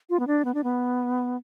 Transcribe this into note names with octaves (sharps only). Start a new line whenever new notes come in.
F4
B3
D4
B3
D4
B3